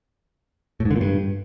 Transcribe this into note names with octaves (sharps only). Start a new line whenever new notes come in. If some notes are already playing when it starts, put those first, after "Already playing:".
A2
G#2
D3
A#2
G2